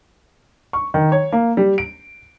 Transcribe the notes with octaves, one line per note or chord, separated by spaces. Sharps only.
C#6
D#3
C#5
A#3
G3
D7